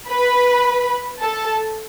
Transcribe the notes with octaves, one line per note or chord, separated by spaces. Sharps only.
B4 B5
A4 A5